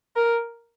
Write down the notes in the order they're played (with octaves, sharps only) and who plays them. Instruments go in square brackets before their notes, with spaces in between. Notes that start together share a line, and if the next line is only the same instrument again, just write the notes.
[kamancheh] A#4